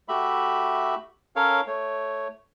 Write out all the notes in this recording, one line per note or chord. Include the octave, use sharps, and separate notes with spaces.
A3 F#4 G4 E5 B5
C#4 A4 A#4 C#5 F5
A3 C#5